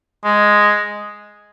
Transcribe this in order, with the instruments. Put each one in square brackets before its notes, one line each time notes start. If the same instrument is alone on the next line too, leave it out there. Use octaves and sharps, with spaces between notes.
[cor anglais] G#3